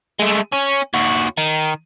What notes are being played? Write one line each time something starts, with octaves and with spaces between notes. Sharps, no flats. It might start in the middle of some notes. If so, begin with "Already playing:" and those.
G#3 A3
C#4
D#2 F#4
D#3